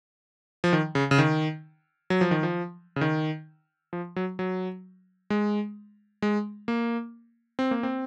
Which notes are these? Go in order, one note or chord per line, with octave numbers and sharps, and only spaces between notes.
F3
D#3
C#3
C#3
D#3
F#3
F3
D#3
F3
C#3
D#3
F3
F#3
F#3
G#3
G#3
A#3
C4
A#3
C4